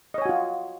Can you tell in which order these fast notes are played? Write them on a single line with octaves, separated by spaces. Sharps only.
D#5 C#5 G#5 F#4 F4